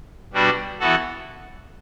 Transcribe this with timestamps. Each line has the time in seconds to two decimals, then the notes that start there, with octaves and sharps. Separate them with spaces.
0.33 B2 G3 D4 F#4
0.79 E3 B3 F#4 A4